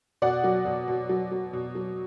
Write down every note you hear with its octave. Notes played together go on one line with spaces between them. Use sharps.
B2 D5 F#5
F#3
B2
B2
F#3
F#3
B2
F#3